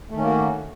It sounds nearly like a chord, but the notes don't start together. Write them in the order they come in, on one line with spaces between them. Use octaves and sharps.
A3 D#3 C#4 A#3 F#4